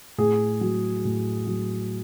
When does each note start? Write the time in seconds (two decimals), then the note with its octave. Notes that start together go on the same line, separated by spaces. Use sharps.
0.18 A2 G#4
0.61 F#3
1.05 A2
1.46 F#3